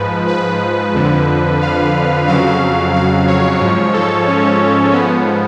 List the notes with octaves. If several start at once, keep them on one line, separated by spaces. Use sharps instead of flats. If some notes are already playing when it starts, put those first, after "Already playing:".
Already playing: G#2 F3 B4
B4
F2 D3 F3
F5
F2 C#3 F#3 F5
F5
C#5
G#2 F3
A4
C#4
G#2 F3 B3